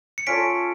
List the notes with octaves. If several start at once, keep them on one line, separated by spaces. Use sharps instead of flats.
C#7
C#4 F4 A4 C#5 B6 D7